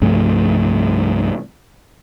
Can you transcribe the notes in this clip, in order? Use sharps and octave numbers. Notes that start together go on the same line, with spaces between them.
C2 G2 F3 A3